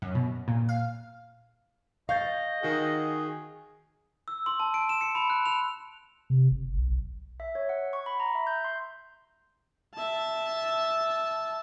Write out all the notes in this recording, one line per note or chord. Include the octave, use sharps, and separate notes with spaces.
F#2
B2
A#2
F5
D#5 F5 C#6 G6 A6
D#3 F#4 G#4
E6
C6
A5
D7
E7
C#7
B5
F#6
F7
C3
F#1
B1
E5
C#5
F#5
C#6
B5
A#5
E5
G6
C6
E5 A5